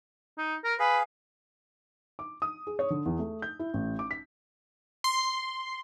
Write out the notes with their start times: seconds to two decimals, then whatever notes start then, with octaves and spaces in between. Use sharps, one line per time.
0.38 D#4
0.65 A#4
0.79 G#4 B4 F5
2.19 D6
2.42 D#6
2.67 G#4
2.79 C#5
2.90 D3
3.06 E2
3.19 A3
3.42 G6
3.59 E4
3.74 A1
3.99 D6
4.11 B6
5.04 C6